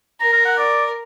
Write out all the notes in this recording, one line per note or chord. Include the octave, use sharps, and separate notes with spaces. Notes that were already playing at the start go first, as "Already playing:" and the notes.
A#4 A#5
A#5
F#5
D5